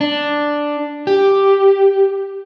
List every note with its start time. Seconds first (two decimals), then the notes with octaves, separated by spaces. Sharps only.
0.01 D4
1.07 G4